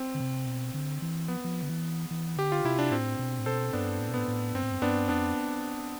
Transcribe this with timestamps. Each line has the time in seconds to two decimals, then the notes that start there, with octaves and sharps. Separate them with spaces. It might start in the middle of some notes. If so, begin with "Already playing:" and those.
Already playing: C4
0.15 D3
0.20 C3
0.46 B2
0.74 D3
1.02 E3
1.28 F3 B3
1.44 F3
1.63 D3
1.69 E3
2.11 E3
2.37 D3 G4
2.52 F4
2.64 C3 E4
2.79 D4
2.91 A2 C4
3.19 B2
3.39 A2
3.46 B2 A4 C5
3.73 G2 B3 D4
4.00 A2
4.09 B2
4.14 A2 B3
4.28 A2
4.54 G2 C4
4.63 A2
4.71 G2
4.82 G2 B3 D4
5.09 F2 B3 D4